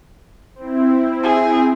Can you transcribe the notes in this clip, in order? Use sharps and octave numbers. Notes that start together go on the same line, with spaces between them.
C4 E4
G#4